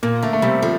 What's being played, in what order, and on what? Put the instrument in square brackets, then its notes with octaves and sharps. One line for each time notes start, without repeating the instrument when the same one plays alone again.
[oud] A#2 [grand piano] A#3
[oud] D3 [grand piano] A3
[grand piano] A3
[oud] C3 [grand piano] G3
[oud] D3 [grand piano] F3